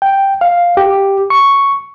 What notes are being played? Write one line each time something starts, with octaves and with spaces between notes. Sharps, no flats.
G5
F5
G4
C#6